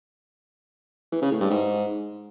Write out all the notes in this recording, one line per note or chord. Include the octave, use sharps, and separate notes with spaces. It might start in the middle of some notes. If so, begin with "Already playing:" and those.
E3
C#3
A2
G2
G#2